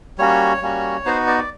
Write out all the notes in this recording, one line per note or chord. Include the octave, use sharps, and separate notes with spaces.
G3 A#3 C#4 F#4 C#5
G3 A#3 C#4 F#4
B3 D#4 F#4 C5
D5
D5